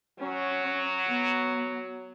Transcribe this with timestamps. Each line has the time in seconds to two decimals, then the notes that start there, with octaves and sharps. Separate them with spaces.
0.19 F#3 C#4
1.07 B3